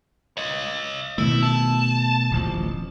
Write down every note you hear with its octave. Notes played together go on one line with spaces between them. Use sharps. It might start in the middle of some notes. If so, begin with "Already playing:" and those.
C#5 D#5
B2 D#3 A3 E4
A5
D1 A1 F3